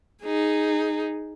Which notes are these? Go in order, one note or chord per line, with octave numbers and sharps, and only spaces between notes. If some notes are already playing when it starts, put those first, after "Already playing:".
D#4 G#4